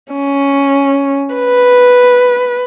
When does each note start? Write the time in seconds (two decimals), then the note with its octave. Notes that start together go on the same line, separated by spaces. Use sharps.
0.12 C#4
1.35 B4